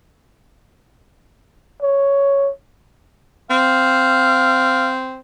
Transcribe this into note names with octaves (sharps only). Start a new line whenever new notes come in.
C#5
C4 F5